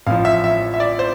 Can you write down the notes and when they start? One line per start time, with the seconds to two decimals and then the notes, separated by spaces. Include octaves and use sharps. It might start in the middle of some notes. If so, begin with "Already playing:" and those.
0.06 A1 A2 F3 F5
0.25 E5
0.44 E5
0.74 E5
0.80 D5
0.99 C5